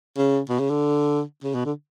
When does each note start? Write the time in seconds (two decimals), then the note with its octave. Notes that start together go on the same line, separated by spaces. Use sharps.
0.17 C#3
0.49 B2
0.59 C#3
0.69 D3
1.44 C#3
1.54 B2
1.65 D3